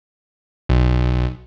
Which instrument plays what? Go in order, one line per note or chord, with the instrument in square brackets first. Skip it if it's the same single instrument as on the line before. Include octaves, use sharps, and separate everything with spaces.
[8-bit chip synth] B1